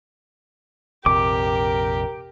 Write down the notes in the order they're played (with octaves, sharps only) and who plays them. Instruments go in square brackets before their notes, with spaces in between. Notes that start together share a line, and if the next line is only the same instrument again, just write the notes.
[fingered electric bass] A#1 F2 C3 [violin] G4 [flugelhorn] A#4 [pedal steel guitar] D6